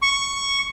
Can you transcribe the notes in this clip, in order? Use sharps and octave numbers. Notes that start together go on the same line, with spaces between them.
C#6